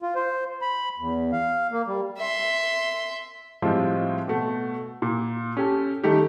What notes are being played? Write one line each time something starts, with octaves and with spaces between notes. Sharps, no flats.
F4
C5
B5
E2
F5
A#3
G3
E5 C6
A2 F3 G3 G#3 C4 F4
B2 A3
A#2
C#4 G4 A4
D#3 G3 A3 D#4 G4